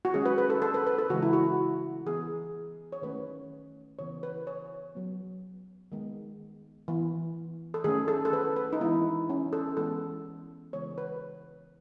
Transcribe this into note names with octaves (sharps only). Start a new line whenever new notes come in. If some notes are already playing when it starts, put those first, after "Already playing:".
F#4
D#3 G#3 C#4 G#4
B4
B4
A4
A4
B4
B4
A4
C#3 E3 G#3 F#4
E4
F#4
E3 B3 G#4
C#5
D#3 A3 C#4 B4
C#3 E3 B3 C#5
B4
C#5
F#3 B3
D#3 G#3 B3
E3 B3
A4
D#3 A3 C#4 G#4
A4
A4
B4
B4
D#4
E3 G#3 B3 E4
C#4
A4
E3 G#3 B3 A4
C#3 E3 G#3 B3 C#5
B4